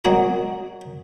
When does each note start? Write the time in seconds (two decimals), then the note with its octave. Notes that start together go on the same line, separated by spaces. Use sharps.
0.05 F#3 G#3 C4 F#4 G#4 A#4